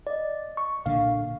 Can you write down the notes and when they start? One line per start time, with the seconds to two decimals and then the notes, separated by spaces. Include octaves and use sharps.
0.07 D5 D#5
0.57 C#6
0.86 B1 A#2 D3 F5